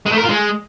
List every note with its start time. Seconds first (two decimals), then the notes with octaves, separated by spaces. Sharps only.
0.06 G#3
0.12 A3
0.18 A#4
0.23 F4
0.29 G#3